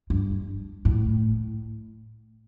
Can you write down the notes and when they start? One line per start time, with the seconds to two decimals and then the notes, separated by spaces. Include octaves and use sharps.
0.10 G2
0.85 A2